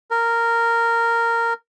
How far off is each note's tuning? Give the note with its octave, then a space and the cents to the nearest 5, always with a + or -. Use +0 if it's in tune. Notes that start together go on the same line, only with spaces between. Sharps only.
A#4 -10